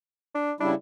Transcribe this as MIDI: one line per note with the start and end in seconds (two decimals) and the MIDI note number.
0.35 0.52 62
0.60 0.75 49
0.60 0.75 55
0.60 0.72 62
0.60 0.75 64